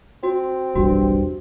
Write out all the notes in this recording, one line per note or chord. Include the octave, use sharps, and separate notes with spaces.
C4 F#4
F1 B1 E2 G2 F#4